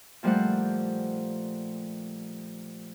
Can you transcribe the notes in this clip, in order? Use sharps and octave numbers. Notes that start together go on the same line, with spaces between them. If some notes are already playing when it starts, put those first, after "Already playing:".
A#2 F3 G3 A3 C5 F#5